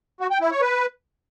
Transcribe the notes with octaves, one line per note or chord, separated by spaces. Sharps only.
F#4
G5
E4
C#5
B4